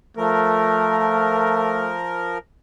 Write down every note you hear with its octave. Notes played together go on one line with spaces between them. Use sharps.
F3 A3 A#4